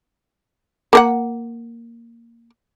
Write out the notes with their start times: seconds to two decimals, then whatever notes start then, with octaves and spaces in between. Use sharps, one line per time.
0.93 A#3 A#4 F#5